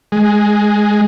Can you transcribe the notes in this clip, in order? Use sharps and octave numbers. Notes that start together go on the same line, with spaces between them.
G#3